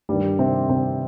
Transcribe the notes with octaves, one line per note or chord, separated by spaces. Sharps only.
G2 D#3 G3
C3 C4
C3 C4